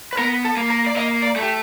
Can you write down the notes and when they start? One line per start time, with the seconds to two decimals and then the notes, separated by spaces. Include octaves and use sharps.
0.13 B4
0.18 B3 A#4
0.45 A4
0.57 A#3
0.70 A#4
0.86 D5
0.96 A#3 D#5
1.22 D5
1.36 A3
1.42 G4